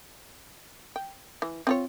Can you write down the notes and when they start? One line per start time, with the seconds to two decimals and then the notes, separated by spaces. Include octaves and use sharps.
0.96 G5
1.42 E3
1.67 C4 F4 C#5